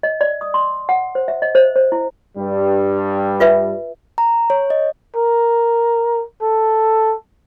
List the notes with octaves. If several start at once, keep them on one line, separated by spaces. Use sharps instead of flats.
D#5
D5
D#6
C6
F#5
C5
E5
D#5
C5
C5
E4
G2 G3
F4 B4 E5
A#5
C#5
D#5
A#4
A4